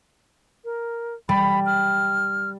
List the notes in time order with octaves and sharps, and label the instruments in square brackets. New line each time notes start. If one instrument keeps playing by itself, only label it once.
[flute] A#4
[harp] G3 [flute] B5
[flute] F6